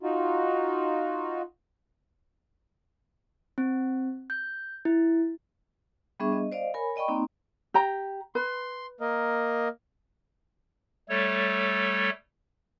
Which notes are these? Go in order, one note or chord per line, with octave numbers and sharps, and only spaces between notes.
D#4 F4 F#4
C4
G6
E4
G3 B3 D4 G#4 E5 C#6
D#5
C5 D5 D#5 F5
A#4 C#5 G#5 B5
D5 D#5 G5 B5 C#6
A#3 C4 D#4
G4 G5 A#5
B4 C6
A#3 A#4 D#5
G3 A3 A4 C#5